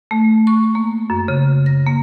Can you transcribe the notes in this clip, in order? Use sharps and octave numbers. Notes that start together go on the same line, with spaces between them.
A3
C#6
A#3
F#2
C#3
A#6
A#3